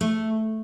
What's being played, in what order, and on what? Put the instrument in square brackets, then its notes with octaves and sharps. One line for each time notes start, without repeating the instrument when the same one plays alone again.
[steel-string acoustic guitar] A3